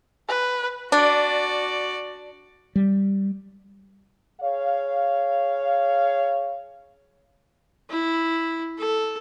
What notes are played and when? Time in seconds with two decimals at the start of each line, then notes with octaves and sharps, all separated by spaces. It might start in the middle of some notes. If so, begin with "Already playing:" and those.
0.28 B4
0.92 D4 F#4 D5
2.76 G3
4.41 G#4 C#5 F5
7.90 E4
8.78 A4